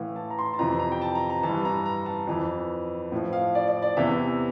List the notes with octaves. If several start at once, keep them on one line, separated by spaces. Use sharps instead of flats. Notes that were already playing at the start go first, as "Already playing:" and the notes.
Already playing: A2 E3 F5
A5
A#5
C6
A#5
A5
F2 C3 E3 A#5
A#5
G5
A5
A#5
A#5
G2 E3 A5
A#5
A#5
A5
F2 E3
A2 F3
F5
D5
D5
D5
E2 C3 E3 E5